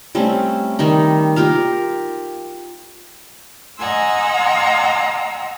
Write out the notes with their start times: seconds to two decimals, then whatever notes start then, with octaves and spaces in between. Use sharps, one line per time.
0.15 G3 A3 C4 C#4
0.79 D#3 G3 D#4
1.36 F4 G4 A#4 F5
3.78 D#5 F#5 G#5 A#5 C6 E6